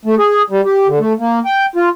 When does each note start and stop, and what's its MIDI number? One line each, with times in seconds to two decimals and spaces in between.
0.05 0.15 57
0.19 0.42 68
0.50 0.61 55
0.65 0.87 67
0.87 0.99 50
0.99 1.13 57
1.19 1.39 58
1.45 1.66 79
1.76 1.89 65